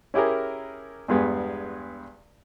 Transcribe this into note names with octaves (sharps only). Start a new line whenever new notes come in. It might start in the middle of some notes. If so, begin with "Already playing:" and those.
C#4 E4 G4 G#4 A#4
E2 G2 G#3 B3